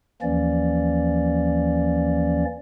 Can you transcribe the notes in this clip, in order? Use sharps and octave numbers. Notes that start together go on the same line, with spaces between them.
D#2 E3 F3 A#3 C#4 D5